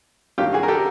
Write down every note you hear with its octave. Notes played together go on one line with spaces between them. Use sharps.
G2 D#3 F#3 A#3 F4 G4
F#4 G#4
A#4
G4 A4